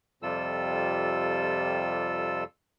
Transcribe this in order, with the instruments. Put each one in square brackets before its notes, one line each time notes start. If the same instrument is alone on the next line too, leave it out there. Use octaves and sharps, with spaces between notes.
[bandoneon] F2 C3 G3 F4 A4 E6